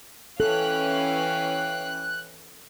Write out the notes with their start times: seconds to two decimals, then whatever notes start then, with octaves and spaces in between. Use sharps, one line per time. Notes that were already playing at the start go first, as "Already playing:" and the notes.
0.40 E3 C#4 A4 F5 G5 F#6